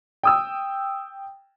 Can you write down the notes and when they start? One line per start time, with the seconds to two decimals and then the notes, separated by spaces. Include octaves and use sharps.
0.23 G5 D#6 E6